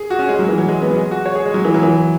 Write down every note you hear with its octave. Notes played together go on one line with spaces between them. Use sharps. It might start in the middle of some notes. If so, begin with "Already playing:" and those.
Already playing: G#4
F#4
C#4
G#3
F#3
E3
F#3
G#3
B3
F#3
G#3
F#4
C#5
G#4
G#3
F#3
E3
F#3
E3